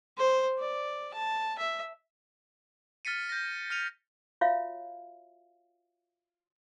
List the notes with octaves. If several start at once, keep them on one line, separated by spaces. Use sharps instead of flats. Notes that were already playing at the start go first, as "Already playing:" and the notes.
C5
D5
A5
E5
F6 A6 B6 C#7 D#7
G6 A#6
F6 C#7 D#7 F7
F4 F#4 C#5 E5 F5